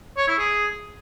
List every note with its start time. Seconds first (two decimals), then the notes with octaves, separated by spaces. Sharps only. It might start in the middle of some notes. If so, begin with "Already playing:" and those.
0.17 C#5
0.28 E4
0.38 G#4